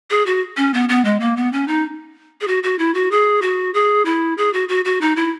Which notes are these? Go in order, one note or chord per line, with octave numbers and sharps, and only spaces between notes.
G#4
F#4
C#4
B3
B3
G#3
A#3
B3
C#4
D#4
G#4
F#4
F#4
E4
F#4
G#4
F#4
G#4
E4
G#4
F#4
F#4
F#4
D#4
E4